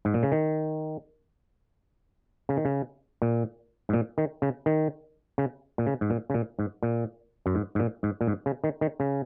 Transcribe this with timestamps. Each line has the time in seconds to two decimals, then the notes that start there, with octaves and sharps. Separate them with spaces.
0.05 G#2
0.14 A#2
0.23 C#3
0.32 D#3
2.49 C#3
2.57 D#3
2.65 C#3
3.22 A#2
3.89 G#2
3.93 A#2
4.18 D#3
4.42 C#3
4.66 D#3
5.38 C#3
5.78 A#2
5.87 C#3
6.01 G#2
6.10 A#2
6.30 C#3
6.34 A#2
6.59 G#2
6.83 A#2
7.46 F#2
7.55 G#2
7.75 G#2
7.79 A#2
8.03 G#2
8.21 A#2
8.28 G#2
8.46 C#3
8.64 D#3
8.81 D#3
9.00 C#3